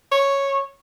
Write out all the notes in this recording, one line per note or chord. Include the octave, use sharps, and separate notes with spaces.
C#5